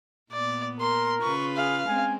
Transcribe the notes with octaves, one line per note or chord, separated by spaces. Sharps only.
A#2 B3 D5
A#4 C6
C#3 F4 B4 C#6
G#4 F5
G#3 C4 C#4 G#5